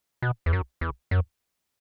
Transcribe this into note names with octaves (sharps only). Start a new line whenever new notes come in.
B2
E2
F#2
E2
F#2